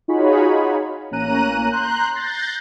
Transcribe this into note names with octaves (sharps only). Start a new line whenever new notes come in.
D#4 F4 F#4 G#4 C#5 B5
A1 A#3 C#4 A#5 F#6 D#7
A#5 C6 F#6 G6
F#6 G6 A6 A#6 C7